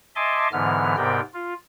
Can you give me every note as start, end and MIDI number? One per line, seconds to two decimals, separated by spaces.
0.16 0.48 75
0.16 0.48 76
0.16 0.48 80
0.16 0.48 81
0.16 0.48 84
0.16 0.48 86
0.52 0.96 44
0.52 0.96 50
0.52 0.96 52
0.52 0.96 59
0.52 0.96 89
0.97 1.21 44
0.97 1.21 48
0.97 1.21 59
0.97 1.21 70
0.97 1.21 74
0.97 1.21 79
1.34 1.54 65